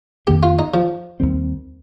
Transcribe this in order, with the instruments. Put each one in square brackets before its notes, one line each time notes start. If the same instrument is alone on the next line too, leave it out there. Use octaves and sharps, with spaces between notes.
[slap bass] F2 D#3 A#3 D4 [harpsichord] G4
[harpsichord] F4
D#4
F3
[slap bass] D#2 D#3 G3 C4